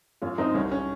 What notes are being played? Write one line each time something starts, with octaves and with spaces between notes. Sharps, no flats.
F#2 C#4 F4
F#2 C4 D#4
C2 C#4
C#4